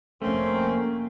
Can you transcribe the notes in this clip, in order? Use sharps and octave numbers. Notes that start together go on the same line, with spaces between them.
F1 A3 A#3 C4 C#4